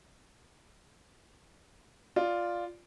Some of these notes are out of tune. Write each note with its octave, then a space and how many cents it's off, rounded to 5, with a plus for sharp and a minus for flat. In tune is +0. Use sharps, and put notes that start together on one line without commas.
F4 +0 D5 +0